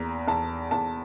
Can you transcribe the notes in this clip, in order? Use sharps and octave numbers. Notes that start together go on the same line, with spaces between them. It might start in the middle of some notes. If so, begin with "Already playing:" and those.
Already playing: E2 A#3 A#5
E2 A5
E2 A5